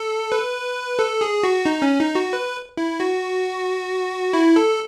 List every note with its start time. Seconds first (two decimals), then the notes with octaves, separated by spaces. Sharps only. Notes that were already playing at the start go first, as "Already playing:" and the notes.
Already playing: A4
0.32 B4
0.99 A4
1.21 G#4
1.43 F#4
1.65 D#4
1.82 C#4
2.00 D#4
2.15 F#4
2.33 B4
2.77 E4
3.00 F#4
4.33 E4
4.56 A4